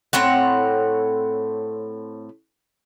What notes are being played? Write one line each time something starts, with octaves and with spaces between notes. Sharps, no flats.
A2 C4 C#5 F#5